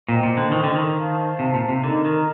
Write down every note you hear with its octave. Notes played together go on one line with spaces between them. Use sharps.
A#2 C5 D#5 G5
A#2
D3
D#3
D3
D#3
C5 F5 A5
C3
A#2
C3
D3 D#4 A#4 D#5 A#5
D#3